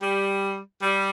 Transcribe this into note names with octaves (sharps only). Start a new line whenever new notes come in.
G3
G3